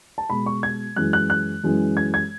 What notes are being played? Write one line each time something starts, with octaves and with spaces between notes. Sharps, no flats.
A5
B2 G#3 B5
C#6
G#6
F#2 E3 G#3 F#6
F#6
F#6
F#2 E3 G#3
G#6
G#6